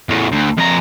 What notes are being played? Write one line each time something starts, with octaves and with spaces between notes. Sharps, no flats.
E2 A2
D2
F2 A#5